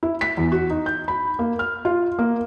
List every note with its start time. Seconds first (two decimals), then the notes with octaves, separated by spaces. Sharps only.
0.03 E4
0.21 B6
0.37 E2
0.52 F#4
0.70 D#4
0.86 G6
1.08 B5
1.39 A#3
1.59 F6
1.85 F4
2.19 A#3